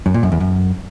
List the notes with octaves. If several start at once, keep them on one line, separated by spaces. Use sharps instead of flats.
F#2
A#2
F#2
E2
F#2